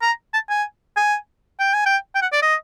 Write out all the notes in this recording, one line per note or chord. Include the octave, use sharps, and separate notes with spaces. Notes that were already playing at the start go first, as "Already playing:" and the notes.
A#5
A5
G#5
G#5
G5
G#5
G5
G5
F#5
D5
D#5